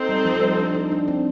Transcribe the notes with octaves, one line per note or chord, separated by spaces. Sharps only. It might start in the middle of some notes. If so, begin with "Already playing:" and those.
Already playing: C4 D#4 A4 C5
G3
F3
G3
D4
D#4
D4
C4